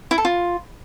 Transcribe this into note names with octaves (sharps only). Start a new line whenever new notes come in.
E4
A4
F4